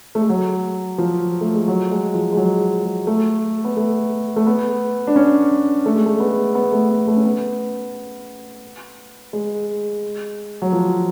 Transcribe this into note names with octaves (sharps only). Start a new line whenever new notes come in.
A3
G#3
F#3
F3
A3
G#3
F#3
G#3
F3
G#3
F#3
G#3
A3
B3
A3
A3
B3
D4
C#4
A3
G#3
A3
B3
B3
A3
B3
A3
C#4
B3
G#3
F#3
F3